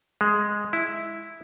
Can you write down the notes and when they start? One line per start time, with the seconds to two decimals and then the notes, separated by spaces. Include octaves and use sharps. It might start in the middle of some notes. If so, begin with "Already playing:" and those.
0.21 G#3
0.73 E4